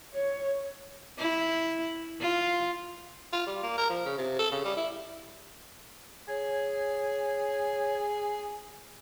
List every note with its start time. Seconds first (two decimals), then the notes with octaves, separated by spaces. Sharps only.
0.14 C#5
1.18 E4
2.20 F4
3.33 F4
3.47 G3
3.63 A#3
3.78 A#4
3.89 F3
4.05 C#3
4.18 C3
4.39 A4
4.51 C#3
4.64 G3
4.77 E4
6.28 G#4 C#5